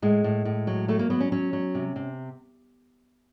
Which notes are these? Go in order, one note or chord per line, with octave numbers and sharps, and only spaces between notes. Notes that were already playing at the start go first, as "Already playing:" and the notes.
A2 G#3
A2
A2
F#3
F#3 A3
A#3
F#3 B3
C#4
F#3 C#4
F#3
C3
C3